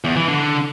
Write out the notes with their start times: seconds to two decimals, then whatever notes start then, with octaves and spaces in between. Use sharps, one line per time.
0.04 E2
0.16 E3
0.28 D3